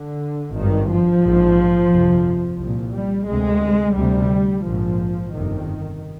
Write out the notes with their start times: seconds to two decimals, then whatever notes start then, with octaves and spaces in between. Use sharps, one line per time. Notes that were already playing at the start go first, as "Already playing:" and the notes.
Already playing: D3
0.55 G#1 G2 D#3
0.89 F3
1.24 A#1 G#2
1.91 G1 F2 C3
2.61 C2 A#2
2.95 G3
3.28 D2 C3 G#3
3.97 D2 C3 G3
4.65 A#1 G#2 F3
5.34 G1 F2 C3 D#3